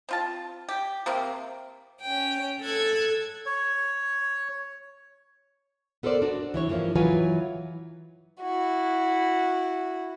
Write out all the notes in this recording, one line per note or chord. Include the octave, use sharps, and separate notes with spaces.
C4 F4 A5
G4
C3 A#3 C4
C#4 G5
A4 E6 F#6 G#6
C#5
B3 A4 A#4 C5 D5
D4 F#4
E3 E4 C#5
G2 E3 F3 A#3
E3 F#3 F4 B4 C#5 G#5
E4 F#4